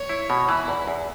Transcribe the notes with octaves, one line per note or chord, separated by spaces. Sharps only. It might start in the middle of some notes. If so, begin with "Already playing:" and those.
Already playing: C#5
E4
B2
E3 E4
E2
E2